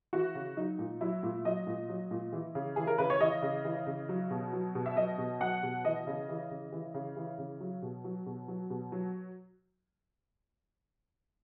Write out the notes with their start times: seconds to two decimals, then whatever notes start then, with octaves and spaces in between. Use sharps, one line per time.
0.13 E3 F#4
0.35 C#3
0.57 F#3 D#4
0.79 A#2
1.01 F#3 E4
1.23 A#2
1.45 F#3 D#5
1.67 A#2
1.89 F#3
2.11 A#2
2.33 E3
2.55 C#3
2.76 E3 G#4
2.87 A#4
2.98 C#3 B4
3.10 C#5
3.20 E3 D#5
3.42 C#3
3.65 E3
3.86 C#3
4.09 F#3
4.31 B2
4.53 F#3
4.75 B2
4.86 E5
4.96 F#3 D#5
5.18 B2
5.40 F#3 F#5
5.63 B2
5.85 E3 D#5
6.07 C#3
6.29 E3
6.51 C#3
6.72 E3
6.94 C#3
7.17 E3
7.38 C#3
7.60 F#3
7.82 B2
8.04 F#3
8.26 B2
8.48 F#3
8.70 B2
8.92 F#3